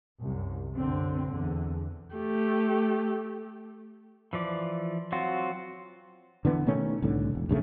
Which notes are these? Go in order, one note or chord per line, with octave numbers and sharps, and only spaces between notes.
C2 F#2
B1 F#2 D3 C4
E2 D3
A3 G4
E3 F3 D5
F#3 C4 F4 F#4
D3 E3 B3
B2 D#3 A3 C#4
C2 A2 D3
E1
B1 G2 C#3 A3